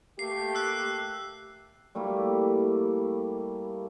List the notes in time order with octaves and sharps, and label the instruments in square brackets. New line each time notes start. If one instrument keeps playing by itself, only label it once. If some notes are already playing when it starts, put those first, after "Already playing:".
[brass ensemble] A3 A#3 G4 [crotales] C7
[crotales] E6 F#6 C7
[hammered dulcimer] G3 A3 A#3 E4